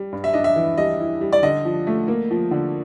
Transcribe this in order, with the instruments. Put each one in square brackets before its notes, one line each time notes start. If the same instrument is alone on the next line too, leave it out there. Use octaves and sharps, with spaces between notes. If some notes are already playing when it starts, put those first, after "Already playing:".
Already playing: [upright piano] G3
G2
[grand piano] E5
[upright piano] D4 [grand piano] D#5
[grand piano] E5
[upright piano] E3
[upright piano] G3 [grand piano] D#5
[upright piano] E4
G3
[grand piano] D5
[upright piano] D3 [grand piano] D#5
[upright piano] F3
A3
A#3
F3
D3